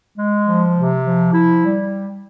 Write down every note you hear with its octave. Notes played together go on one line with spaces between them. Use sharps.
G#3
F3
C3
F3
E4
G3